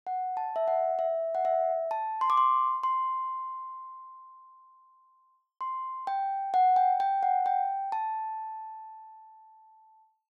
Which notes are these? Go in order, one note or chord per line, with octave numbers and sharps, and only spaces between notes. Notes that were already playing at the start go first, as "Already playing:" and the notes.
F#5
A5
E5
F#5
E5
F#5
E5
A5
C6
D6
C6
C6
C6
G5
F#5
G5
G5
F#5
G5
A5